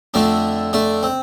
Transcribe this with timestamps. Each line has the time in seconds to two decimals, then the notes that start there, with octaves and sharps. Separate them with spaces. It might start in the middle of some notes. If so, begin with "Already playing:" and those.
0.14 F2 D3 A3 D4
0.73 A3 D4
1.03 C4